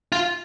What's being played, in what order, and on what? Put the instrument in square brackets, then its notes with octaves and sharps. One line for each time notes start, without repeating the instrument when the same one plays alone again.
[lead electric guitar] F4